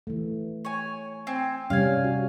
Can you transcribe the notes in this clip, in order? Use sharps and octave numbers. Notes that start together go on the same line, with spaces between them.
E3 A3
C#5 G#5
C4 G#5
C3 G3 C#4 F5 G#5
F#4